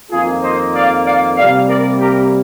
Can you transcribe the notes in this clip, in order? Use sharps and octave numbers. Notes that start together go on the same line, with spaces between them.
F2 D#3 A#3 F4 G#4
C5 D#5
D5 F5
D5 F5
C3 G3 A#3 D5 F5
A#4 D5
G4 A#4